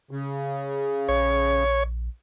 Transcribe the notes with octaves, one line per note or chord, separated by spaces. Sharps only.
C#3
A#1 C#5